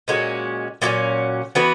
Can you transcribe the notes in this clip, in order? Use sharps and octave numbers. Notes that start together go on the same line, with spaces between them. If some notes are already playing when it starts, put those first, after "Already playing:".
A#2 G#3 C#4 F#4
A#2 F#3 A#3 C#4
E3 B3 F#4 B4